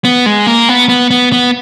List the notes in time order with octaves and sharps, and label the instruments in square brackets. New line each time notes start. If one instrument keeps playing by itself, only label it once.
[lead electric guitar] B3
G#3
A#3
B3
B3
B3
B3